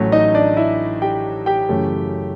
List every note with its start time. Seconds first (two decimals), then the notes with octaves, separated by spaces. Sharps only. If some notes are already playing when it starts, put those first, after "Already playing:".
Already playing: A1 A2 F#3 A3 C#4
0.12 D#4 D#5
0.34 D4 D5
0.57 E4 E5
1.02 G4 G5
1.46 G4 G5
1.69 F#2 C#3 E3 A3 C#4